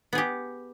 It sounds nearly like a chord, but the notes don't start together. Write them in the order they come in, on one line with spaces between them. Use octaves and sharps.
B3 G#4 G4